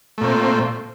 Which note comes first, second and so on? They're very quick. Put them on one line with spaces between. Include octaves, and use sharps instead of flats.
A3 A#2 C4